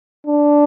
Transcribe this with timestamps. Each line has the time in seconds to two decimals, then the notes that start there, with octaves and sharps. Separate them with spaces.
0.27 D4